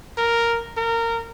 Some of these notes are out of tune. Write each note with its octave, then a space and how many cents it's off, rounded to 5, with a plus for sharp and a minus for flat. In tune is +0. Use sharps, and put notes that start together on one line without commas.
A#4 +0
A#4 -20